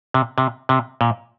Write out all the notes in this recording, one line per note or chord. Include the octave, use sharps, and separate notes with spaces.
C3
C3
C3
A#2